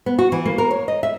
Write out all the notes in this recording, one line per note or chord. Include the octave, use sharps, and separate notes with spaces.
B3
F#4
E3
A#3
A#4
C#5
D#5
E5